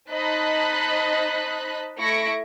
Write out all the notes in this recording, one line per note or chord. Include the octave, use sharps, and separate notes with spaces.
D#4 C5 D#5 A5 B5 F#6
A3 E4 C#6 A#6 C#7 D7